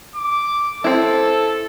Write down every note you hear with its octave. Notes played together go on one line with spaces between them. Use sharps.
D6
C4 E4 A4